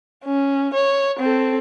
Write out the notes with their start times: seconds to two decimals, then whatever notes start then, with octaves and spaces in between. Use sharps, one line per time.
0.25 C#4
0.74 C#5
1.19 C4 A4